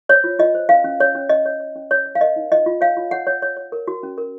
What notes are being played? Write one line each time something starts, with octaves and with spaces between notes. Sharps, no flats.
C5 C#5
F4
F4 D#5
C5
C#4 F5
C#4
C#5
C#4
C#4 D#5
C#5
C#5
C#4
C#5
C#5
F5
A#4 D#5
D#4
F4 D#5
F4
C#5 F5
F4
C#5 F#5
C#5
C#5
C#5
A#4
F#4
C#4
A#4